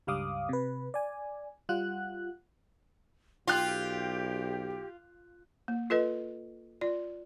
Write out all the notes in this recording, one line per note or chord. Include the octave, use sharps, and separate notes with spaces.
C#2 G2 G3 F5 D6 D#6
C3 B4
D5 G#5
G3 F4 F#5 F#6
B1 F4 G4 G5 F#6
A#3
F4 A4 B4 D#5
F4 D5